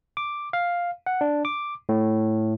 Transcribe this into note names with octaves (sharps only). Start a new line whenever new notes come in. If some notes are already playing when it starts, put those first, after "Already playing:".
D6
F5
F#5
D4
D6
A2